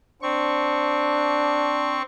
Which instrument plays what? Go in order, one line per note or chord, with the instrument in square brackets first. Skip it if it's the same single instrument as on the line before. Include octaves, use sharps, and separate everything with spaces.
[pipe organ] C4 C#6 [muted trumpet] D4